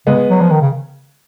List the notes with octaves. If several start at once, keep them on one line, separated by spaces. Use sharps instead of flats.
C#3 G#3 B3
F#3
F3
D#3
C#3